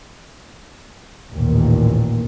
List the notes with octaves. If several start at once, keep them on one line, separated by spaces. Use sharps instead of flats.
A1 D#2 A#2